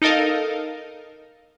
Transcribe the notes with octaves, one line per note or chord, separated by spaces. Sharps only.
D#4 A4 A#4 D#5 F5